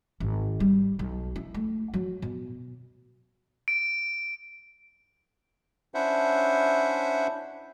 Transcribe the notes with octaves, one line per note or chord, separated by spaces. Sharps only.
G#1
G3
B1
E4
A3
F#3
B2
D7
C#4 D4 E4 C5 E5 F#5